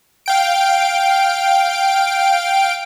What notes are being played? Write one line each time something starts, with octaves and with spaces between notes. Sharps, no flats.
F5 G5 D7